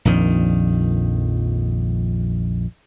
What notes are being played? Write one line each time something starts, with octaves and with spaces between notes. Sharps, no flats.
A#1 F2 D#3